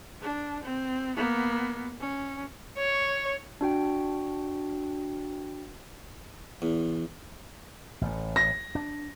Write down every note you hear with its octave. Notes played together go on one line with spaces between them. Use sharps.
D4
C4
A#3 B3
C#4
C#5
D4 F#4 G5
E2
A1 A2
A#6
D4